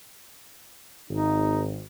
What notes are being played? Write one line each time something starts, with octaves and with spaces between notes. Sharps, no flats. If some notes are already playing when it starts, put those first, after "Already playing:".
G#1 D#4